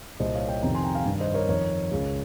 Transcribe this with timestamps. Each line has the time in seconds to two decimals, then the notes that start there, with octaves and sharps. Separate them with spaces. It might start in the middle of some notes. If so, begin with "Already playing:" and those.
0.20 C2 A#2 C5 D#5
0.34 C#5 F5
0.48 D#5 G5
0.62 F2 C3 D#3 G5 A#5
0.74 G#5 C6
0.84 G5 A#5
0.95 F5 G#5
1.06 G2 D#3
1.20 C5 D#5
1.34 A#4 C#5
1.48 F2 D#3 A#4 C#5
1.91 C#2 C#3